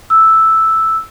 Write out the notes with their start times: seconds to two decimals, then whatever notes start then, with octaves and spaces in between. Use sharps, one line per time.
0.10 E6